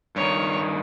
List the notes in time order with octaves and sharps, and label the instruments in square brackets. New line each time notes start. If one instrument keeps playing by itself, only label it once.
[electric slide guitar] G2 D#3 [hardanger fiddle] C#5